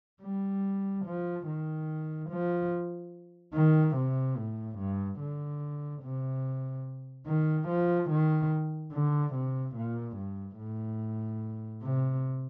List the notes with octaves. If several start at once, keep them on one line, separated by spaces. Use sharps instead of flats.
G3
F3
D#3
F3
D#3
C3
A2
G2
D3
C3
D#3
F3
D#3
D3
C3
A#2
G2
A2
C3